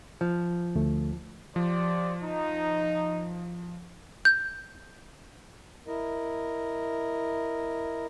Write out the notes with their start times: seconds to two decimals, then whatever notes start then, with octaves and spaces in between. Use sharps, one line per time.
0.21 F3
0.75 D2 A3
1.56 F3 G4 C5 D5
2.23 D#4
4.25 G6
5.87 E4 A#4 D#5